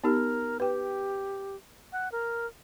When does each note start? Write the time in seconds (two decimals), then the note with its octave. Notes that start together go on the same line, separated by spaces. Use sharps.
0.04 B3 D#4 G4 A#4
0.60 G4 B4 G5
1.92 F#5
2.12 A#4